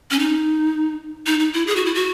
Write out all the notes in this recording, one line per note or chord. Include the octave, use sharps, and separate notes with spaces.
C#4
D#4
D#4
D#4
E4
G#4
F#4
E4
F#4